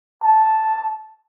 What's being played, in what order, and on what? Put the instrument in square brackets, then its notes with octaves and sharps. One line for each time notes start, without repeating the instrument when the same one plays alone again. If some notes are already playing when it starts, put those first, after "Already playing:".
[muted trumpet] A5